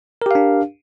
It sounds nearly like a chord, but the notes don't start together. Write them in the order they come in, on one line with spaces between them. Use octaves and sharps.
A#4 G4 F5 D4